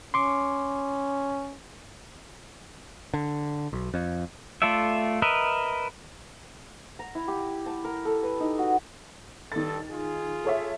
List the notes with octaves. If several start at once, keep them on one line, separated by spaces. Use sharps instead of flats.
C#4 C6 D6
D3
B1
F2
A3 F4 A4 D5 E5
A#4 B4 D#5 E5
A#5
E4
G4
A5
A#4
A4
B4
D#4
F#4
G2 D#3 A4 A6
F4 G#4
A4 C#5 E5